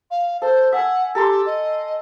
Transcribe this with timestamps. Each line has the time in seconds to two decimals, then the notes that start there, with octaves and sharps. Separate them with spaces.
0.11 F5
0.42 A4 C5
0.73 E5 F#5 G#5
1.15 G4 A4 A#5 C6
1.46 D#5